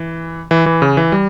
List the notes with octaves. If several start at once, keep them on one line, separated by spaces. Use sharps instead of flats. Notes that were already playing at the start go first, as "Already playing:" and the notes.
Already playing: E3
E3
E3
C#3
E3
G3